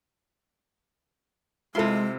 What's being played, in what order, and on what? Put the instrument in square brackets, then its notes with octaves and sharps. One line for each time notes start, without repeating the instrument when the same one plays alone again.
[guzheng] C3 C6 [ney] G#3 [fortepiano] E4 F4 A4